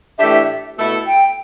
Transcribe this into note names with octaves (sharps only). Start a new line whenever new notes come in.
A2 E3 A3 D4 G4 E5
E5
B2 A3 E4 A4
G5